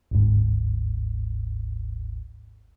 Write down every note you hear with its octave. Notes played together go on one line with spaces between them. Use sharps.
G1 D2 G#2